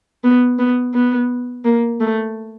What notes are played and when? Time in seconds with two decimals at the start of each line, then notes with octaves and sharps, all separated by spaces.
0.24 B3
0.59 B3
0.94 B3
1.65 A#3
2.00 A3